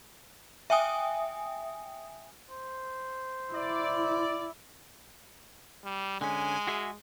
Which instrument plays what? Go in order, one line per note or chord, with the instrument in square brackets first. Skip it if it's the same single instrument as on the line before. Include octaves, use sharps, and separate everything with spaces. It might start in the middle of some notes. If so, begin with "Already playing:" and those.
[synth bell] E5 G5 G#5 D#6
[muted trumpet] C5
[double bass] E4 [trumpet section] D5
[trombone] G3
[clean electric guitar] D3 C#4 [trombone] G#3 [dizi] G#5
[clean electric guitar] F#4 G#4 E5